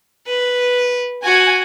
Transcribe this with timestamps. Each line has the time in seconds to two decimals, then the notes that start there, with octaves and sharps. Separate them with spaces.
0.26 B4
1.24 F#4 G#5